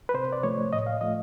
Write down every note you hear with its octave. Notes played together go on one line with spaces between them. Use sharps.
B4
C3 C5
D5
F3 A3 C#5
A2 D#5
F5
F3 A3 D#5